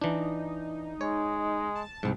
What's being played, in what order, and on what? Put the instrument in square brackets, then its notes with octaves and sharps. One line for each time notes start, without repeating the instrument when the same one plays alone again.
[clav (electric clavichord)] E3 D4 [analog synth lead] D#4
[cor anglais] G#3 [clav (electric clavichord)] C#5
[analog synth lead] A5
[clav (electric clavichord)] C2 G#2